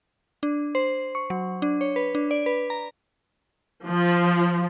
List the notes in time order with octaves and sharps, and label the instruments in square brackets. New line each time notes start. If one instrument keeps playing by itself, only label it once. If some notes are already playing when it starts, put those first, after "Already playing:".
[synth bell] D4
C5
C#6
F#3
D4
C#5
B4
D4
D5
B4
A#5
[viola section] F3